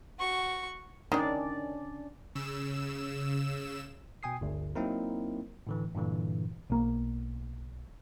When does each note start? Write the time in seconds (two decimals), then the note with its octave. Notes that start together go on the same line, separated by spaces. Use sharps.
0.19 F#4 C#6
1.12 D#3 G#3 C#4 D4 D5
2.35 C#3 E6 E7
4.23 B2 G5 G#5 D#6 C7
4.41 G1 D2
4.75 F#3 A#3 C4 D#4 E4 A#4
5.67 A2 D3 E3
5.95 G2 A#2 D3 E3
6.70 B1 A#3